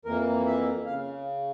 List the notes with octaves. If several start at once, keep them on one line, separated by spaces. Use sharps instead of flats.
F2 E3 A#3 A#4
E5
C#3 F5